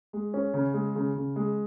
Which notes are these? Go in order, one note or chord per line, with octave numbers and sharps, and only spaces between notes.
G#3
C#4
C#3
G#3
C#3
C#3
G#3